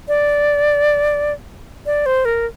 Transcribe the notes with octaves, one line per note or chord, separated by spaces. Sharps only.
D5
D5
C5
A#4